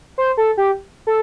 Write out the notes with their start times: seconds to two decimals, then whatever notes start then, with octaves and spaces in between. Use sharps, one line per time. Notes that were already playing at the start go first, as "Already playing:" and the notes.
0.18 C5
0.37 A4
0.57 G4
1.07 A4